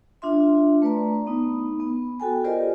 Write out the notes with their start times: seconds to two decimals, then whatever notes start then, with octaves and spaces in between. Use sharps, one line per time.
0.22 D4 F4 E5 C6
0.82 A3 B4 D5 A#5
1.27 B3 D#4
1.80 B3
2.20 F#4 A4 G5 G#5
2.44 F4 G4 A#4 C5 D5 D#5